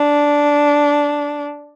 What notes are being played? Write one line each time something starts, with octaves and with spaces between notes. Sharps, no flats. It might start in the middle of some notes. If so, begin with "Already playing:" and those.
Already playing: D4